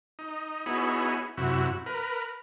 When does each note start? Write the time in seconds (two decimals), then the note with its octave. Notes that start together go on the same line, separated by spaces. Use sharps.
0.19 D#4
0.66 B3 D#4 E4 F#4 G#4 C#5
1.37 F#2 C3 E4 F#4
1.86 A#4 B4